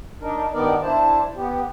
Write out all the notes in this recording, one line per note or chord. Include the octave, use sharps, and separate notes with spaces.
D4 D#4 A#4
G2 D#3 B3 D#4 A#4 D5
D4 E4 C5 A5
B3 G4